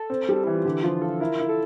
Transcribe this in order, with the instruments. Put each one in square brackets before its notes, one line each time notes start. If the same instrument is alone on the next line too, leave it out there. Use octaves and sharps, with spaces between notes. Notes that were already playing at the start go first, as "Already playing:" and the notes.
Already playing: [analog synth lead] A4
[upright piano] C4
G3
[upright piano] E3 [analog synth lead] E4
[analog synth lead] F4
[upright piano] D3 [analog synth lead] G4
[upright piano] F3 [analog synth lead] F4
[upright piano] F4 [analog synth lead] A4
[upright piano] E4 [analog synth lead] A#4
[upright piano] E4
[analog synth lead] A4